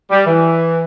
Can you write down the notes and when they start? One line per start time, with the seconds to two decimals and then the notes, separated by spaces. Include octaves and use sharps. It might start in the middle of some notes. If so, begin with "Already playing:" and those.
0.11 G3
0.26 E3